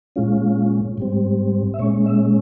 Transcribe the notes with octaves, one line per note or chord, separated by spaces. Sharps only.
A#2 G#3 C#4 F4
G#2 G3 C4
E5
A#2 G#3 C#4 C#5
E5